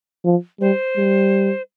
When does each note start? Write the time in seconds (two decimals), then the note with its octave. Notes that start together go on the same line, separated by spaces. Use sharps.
0.25 F3
0.60 G3 C5
0.97 G3